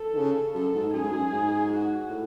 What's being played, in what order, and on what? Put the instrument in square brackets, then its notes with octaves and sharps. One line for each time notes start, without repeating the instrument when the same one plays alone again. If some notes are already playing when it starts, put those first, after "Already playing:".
Already playing: [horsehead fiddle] A4
[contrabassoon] D#3
C#3
[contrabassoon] F#2 [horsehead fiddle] A4
[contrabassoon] G#2
[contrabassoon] F#2 [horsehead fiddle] G#4
[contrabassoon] G#2
F#2
G#2
[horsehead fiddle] F#4
[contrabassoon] A2